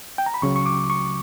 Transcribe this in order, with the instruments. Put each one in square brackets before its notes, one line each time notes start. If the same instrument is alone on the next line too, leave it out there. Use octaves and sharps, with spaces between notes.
[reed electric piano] G5
A#5
B5
C#2 C#3 F#3 C#6
C#6
D6
C#6